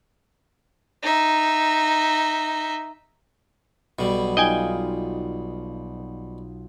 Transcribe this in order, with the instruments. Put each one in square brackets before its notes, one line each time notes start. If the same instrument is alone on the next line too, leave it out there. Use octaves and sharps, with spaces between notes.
[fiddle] D#4 E5
[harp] B1 [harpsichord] B2 G3
[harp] D#4 F4 [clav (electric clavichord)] D#5 G5 G#5